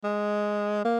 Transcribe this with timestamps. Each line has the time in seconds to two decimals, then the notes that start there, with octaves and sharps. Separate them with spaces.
0.04 G#3
0.85 A#3